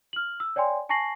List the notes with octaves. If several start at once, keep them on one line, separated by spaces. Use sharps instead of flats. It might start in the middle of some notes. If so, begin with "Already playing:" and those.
F6 F#7
E6
C#5 D5 G5 G#5 C6
G#5 A5 C#6 A#6 C7 F#7